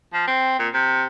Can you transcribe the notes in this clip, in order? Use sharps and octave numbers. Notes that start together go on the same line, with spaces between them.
F3
C4
A#2
C3